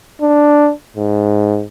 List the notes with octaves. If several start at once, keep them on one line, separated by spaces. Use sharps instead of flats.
D4
G#2